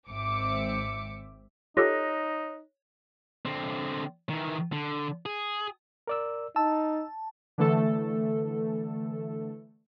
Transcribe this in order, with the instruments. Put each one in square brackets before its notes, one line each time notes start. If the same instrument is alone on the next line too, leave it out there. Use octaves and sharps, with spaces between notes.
[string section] G#1 C4 E5 D6 C#7
[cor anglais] D#4 [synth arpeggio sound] F4 G4 A4 [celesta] C#5 F#6 A#6
[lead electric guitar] D3 C4
D#3 E3
D3
G#4
[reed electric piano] A#4 D5 E6
[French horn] D#4 [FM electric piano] A5 [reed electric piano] E6
[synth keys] D3 E3 A3 A4